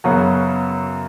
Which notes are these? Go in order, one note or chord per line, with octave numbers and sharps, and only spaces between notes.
F#2 C#3 F#3 B3 F#4